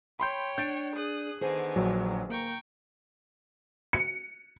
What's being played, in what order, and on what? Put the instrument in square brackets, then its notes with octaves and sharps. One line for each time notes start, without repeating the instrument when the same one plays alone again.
[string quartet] C#5 G5 [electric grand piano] B5 C6 G6
[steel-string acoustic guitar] D4 [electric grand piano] G6 A6 D7
[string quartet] G#4 D#6 F#6
[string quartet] D3 D#3 B3 [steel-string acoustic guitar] G#4 C5 G#5
[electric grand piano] A#1 F#3
[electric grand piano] A#3 [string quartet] G5 A#5 C#6
[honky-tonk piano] C#7